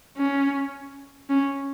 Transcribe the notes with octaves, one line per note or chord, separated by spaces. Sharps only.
C#4
C#4